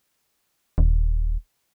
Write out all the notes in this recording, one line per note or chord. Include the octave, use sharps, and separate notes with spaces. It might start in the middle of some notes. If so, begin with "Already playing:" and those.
D#1